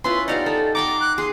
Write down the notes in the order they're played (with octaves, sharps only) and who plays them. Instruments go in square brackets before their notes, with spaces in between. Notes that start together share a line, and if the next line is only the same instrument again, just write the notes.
[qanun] C#4 E4 F4 [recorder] B4 [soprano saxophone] C6
[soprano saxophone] D#4 [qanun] G4 F5 F#5 [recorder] D5
[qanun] D#4 [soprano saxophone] A4
[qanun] F#5 G5 C6 [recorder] A#5 [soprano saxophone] D6
[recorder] F#6
[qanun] G#4 [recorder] C6